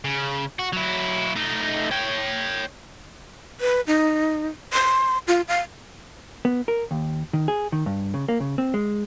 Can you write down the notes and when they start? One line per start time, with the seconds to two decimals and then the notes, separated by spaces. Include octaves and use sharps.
0.05 C#3
0.59 F#4
0.73 F#3 E4
1.36 A3 D#4
1.91 C#5 G5
3.61 B4
3.87 D#4
4.73 C6
5.28 F4
5.48 F5
6.45 B3
6.68 A#4
6.91 D#2
7.33 D#3
7.48 G#4
7.72 D#3
7.86 G2
8.14 C#3
8.28 A#3
8.40 C#3
8.58 C4
8.74 G#3